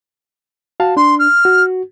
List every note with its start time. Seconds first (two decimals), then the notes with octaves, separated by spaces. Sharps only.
0.80 F#4 F5 A5
0.97 D4 C6
1.19 F6
1.45 F#4